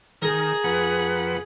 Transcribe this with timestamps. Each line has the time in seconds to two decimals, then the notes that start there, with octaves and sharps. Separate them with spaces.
0.22 D#3 G#4 A#4
0.64 F2 B4 F#5